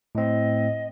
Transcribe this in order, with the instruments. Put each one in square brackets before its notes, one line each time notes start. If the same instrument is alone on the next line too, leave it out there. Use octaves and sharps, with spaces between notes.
[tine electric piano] A2 C4 [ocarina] D#5